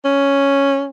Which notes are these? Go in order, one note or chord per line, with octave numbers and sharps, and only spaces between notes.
C#4